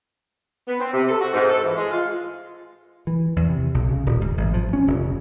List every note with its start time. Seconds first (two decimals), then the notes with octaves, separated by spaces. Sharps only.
0.67 B3
0.79 C4
0.92 C3
1.08 A4
1.20 F#4
1.33 G#2
1.49 A4
1.63 E3
1.76 G#3
1.91 F4
3.07 E3
3.36 E2
3.49 C3
3.74 B1
3.89 C#3
4.06 D#1
4.21 G#2
4.37 A1
4.54 F3
4.73 C#4
4.87 F1
5.04 C#3